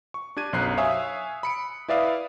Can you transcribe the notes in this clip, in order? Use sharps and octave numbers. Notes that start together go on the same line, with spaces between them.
C#6
D4 G4 G#6 D#7
B1 F#2 C5 F#6 C7
C#5 E5 F5 G#5 D#6 E6
B5 C#7 D7
E4 B4 D5 E5 F5 D#6